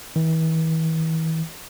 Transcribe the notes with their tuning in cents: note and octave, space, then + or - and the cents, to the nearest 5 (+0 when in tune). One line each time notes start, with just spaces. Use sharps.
E3 -40